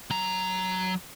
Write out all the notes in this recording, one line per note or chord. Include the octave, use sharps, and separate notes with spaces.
F#3 A#5